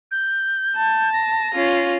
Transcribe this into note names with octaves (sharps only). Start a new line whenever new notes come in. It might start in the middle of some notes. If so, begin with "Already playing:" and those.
G6
A5
A#6
C#4 F4